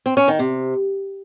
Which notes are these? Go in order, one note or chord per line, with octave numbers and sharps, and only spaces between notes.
C4
C#4
D#3
C3